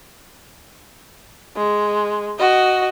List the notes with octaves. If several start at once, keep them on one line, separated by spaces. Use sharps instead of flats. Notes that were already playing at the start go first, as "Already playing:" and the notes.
G#3
F#4 D#5